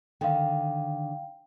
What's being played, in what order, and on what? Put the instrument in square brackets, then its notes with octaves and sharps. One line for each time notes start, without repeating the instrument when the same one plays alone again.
[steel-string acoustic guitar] D3 D#3 [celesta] F5 G5